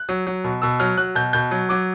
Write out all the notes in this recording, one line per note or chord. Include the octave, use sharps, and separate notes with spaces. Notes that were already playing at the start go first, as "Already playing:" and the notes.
Already playing: F#6
F#3
F#3
B2
B2 E6
F#3 F6
F#3 F#6
B2 G6
B2 G6
F#3
F#3 D6